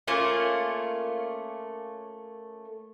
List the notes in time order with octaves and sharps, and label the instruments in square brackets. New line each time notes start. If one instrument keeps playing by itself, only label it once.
[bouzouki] A3 A#3 C#4 F4